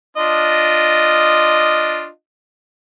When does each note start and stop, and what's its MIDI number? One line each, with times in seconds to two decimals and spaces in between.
0.17 2.08 62
0.17 2.08 65
0.17 2.08 75